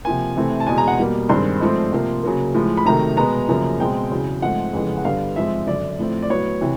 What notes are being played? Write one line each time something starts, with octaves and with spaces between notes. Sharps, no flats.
C3 F3 A#3 G#5
C3 E3 A3 C4
A5
E2 B2 G#3 G#5
A#5
F#5
B2 G3 A#3
G2 D#3 G#3 C4 C6
G#2 F3 A3 C4
C3 F3 A#3
C#3 F#3 A#3
A2 F3 G#3
B5
C3 D#3 F#3 A3 A#5
B2 G#3 B3 A#5
F#2 C#3 F3 A#3
B2 G#3 C4 G5
E2 C#3 F#3
G#2 F3 A3 C4 F#5
F2 C#3 E3 G#3 B3
F#5
G2 D3 G3 B3 F5
G#2 F3 G#3 C4 E5
F#2 D3 F#3 D5
A2 F3 A3 C4
D5
A2 F#3 B3 C#5
C3 E3